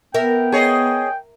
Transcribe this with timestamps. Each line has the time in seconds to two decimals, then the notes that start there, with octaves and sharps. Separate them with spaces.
0.14 B3 A#4 E5 G5
0.52 G#4 C#5 D#5